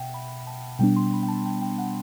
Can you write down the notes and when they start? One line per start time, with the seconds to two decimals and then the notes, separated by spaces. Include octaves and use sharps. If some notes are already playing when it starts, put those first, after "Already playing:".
Already playing: B2 E5 F#5 G5
0.14 B5
0.39 B5
0.47 A5
0.79 B2 G3 B3 D4 G5
0.96 C6
1.13 B5
1.23 G5
1.28 A5
1.46 G5
1.62 G5
1.78 F#5